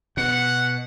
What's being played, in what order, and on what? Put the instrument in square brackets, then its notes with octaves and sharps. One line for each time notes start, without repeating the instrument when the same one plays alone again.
[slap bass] B2 [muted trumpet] F#5